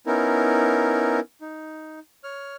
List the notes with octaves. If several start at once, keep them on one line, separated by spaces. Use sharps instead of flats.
B3 C#4 D#4 E4 A#4
D#4
C#5 F6